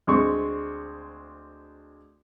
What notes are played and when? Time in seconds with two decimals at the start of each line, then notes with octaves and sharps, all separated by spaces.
0.07 D2 G#3 C4 C#6